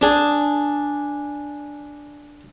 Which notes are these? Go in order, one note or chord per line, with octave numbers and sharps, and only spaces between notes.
D4 G#4